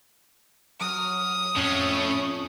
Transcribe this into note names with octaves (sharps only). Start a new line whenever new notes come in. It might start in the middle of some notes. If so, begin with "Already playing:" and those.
F#3 D#6 F6
F2 A2 C#4